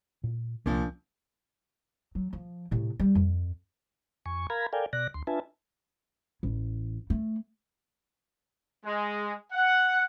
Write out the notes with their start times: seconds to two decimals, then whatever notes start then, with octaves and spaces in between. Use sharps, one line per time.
0.24 A#2
0.66 C2 A#2 F3 C#4 D4
2.15 F#3
2.33 F3
2.71 A2 C3
3.00 G3
3.15 F2
4.26 F2 G#5 C#6
4.50 A#4 F5 A#5 B5 G#6
4.73 A4 A#4 D5 F5 G5 G#5
4.93 B2 D5 F#6 A#6
5.14 D2 C6
5.27 D4 F4 B4 E5 G#5 A5
6.43 A1
7.10 A3
8.84 G#3
9.52 F#5